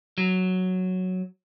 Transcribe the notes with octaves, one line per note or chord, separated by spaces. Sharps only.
F#3